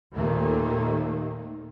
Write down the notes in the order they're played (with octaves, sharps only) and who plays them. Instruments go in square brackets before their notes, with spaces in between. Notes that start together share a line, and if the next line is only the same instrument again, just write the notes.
[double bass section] D#2 A#2 D#3 A3 A#3